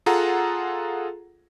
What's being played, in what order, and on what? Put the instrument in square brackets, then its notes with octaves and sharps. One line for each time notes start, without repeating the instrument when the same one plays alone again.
[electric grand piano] F4 G#4 A4 F#5 A#5